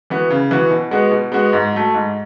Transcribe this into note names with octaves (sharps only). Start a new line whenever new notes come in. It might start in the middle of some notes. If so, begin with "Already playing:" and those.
E3 B3 F#4
C#3
E3 B3 F#4
B2
G#3 B3 F#4
B2
G#3 B3 F#4
G#2
F#3 A3
G#2